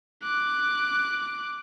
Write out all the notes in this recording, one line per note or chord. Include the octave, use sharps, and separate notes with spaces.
D6 F#6